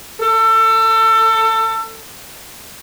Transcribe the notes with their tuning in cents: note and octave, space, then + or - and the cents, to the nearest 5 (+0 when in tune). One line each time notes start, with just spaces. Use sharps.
A4 +25